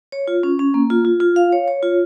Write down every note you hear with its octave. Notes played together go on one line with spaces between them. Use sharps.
C#5
F4
C#4
C#4
A#3
F4
F4
F4
F5
C#5
C#5
F4